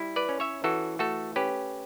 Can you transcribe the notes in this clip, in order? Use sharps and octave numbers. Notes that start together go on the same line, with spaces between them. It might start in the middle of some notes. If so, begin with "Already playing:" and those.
Already playing: G3 E4
B4 D5
C#4
C#5 E5
E3 F#4 A4
A3 F#4 A4
C#4 G4 B4